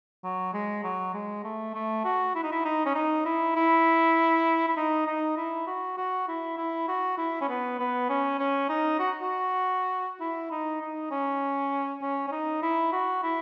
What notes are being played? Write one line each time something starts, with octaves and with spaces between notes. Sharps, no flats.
F#3
G#3
F#3
G#3
A3
A3
F#4
E4
D#4
E4
D#4
C#4
D#4
E4
E4
E4
D#4
D#4
E4
F#4
F#4
E4
E4
F#4
E4
C#4
B3
B3
C#4
C#4
D#4
F#4
F#4
E4
D#4
D#4
C#4
C#4
C#4
D#4
E4
F#4
E4